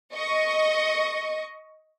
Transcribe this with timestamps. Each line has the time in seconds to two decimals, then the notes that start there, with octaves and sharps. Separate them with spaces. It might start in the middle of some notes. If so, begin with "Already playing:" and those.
0.13 D#5 C#6